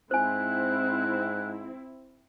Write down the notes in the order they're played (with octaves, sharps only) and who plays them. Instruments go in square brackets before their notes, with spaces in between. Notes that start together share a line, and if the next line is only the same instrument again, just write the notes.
[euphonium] G#2 [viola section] C4 E4 [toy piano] C5 G#5 [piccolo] F#6